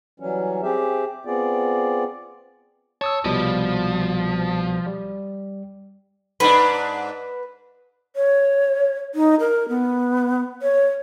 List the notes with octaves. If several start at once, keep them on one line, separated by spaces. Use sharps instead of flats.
E3 F#3 G3 C#4
C4 G4 G#4 E5
B3 C4 F4 G#4 D5
C#5 A5 D#6 E6
C2 B2 F3 G3
G3
G#2 D4 B4
C#5
D#4
A#4
B3
C#5